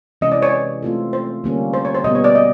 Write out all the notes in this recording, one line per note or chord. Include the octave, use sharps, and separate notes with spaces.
C3 E3 G#3 C#4 D#5
D5
C#5
A3 C4 F4 A4
C5
D3 G3 A#3 C#4
C5
C#5
C5
B2 G3 B3 D#5
C#5
D5
D#5